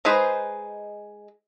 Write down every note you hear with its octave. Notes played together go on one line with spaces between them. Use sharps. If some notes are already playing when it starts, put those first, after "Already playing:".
G#3 D#4 G#4 B4 C5